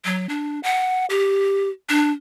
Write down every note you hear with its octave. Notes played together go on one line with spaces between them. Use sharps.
F#3
D4
F#5
G4
D4